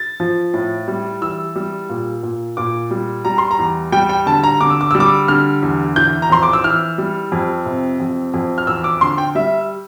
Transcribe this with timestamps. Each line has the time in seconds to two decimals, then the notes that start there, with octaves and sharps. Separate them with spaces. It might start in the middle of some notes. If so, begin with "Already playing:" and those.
Already playing: A6
0.20 F3
0.54 A2
0.88 G3
1.22 E3 E6
1.56 G3
1.89 A#2
2.23 A#2
2.57 A#2 D6
2.91 G3
3.25 G3 A#5
3.38 C6
3.51 A#5
3.59 E2
3.92 G3 G5
4.09 G5
4.26 D3 A5
4.43 A#5
4.61 D3 D6
4.70 E6
4.81 D6
4.91 G3 E6
5.00 D6
5.28 D3 F6
5.62 E2
5.96 E3 G6
6.22 A#5
6.30 F2 C6
6.43 D6
6.53 E6
6.64 E3 F6
6.98 G3
7.32 F2
7.66 C3
8.00 F2
8.34 F2
8.58 F6
8.67 E2 E6
8.84 D6
9.01 D3 C6
9.18 G5
9.35 G3 E5